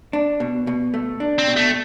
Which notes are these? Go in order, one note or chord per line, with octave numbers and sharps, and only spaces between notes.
D4
B2
B2
A3
D4
C4
B2
A3